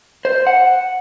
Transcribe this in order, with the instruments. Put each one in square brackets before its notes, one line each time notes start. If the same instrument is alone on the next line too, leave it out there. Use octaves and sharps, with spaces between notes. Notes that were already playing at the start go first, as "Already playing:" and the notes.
[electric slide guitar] C5
F#5